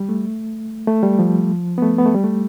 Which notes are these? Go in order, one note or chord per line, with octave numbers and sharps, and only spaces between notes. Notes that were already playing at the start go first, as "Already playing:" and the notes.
Already playing: G3
A3
A3
G3
F3
B3
A3
B3
A3
G3
A3